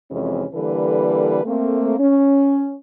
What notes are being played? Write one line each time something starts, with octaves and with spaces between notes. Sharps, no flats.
F2 C3 E3 G#3 C#4
D3 E3 G3 A#3 A4 B4
A3 A#3 C4
C#4